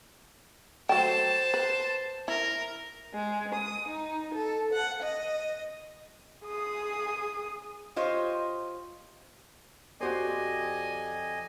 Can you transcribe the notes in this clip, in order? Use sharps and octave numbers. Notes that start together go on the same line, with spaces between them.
F#3 A3 C5 G5 A5
B4
E4 A#4
G#3
D#6
D#4
A4
F#5
D#5
G#4 D#6
F4 G4 C5 C#5 D#5
F2 F#4 G4 C5 D5 D#5 G#5